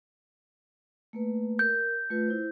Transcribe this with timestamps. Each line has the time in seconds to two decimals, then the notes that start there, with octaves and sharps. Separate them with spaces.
1.13 A3 A#3 B4
1.59 A#4 G6
2.10 A3 F4 B4
2.28 E4 C5